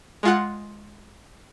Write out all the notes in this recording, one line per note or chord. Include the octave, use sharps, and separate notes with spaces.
G#3 F4 F#5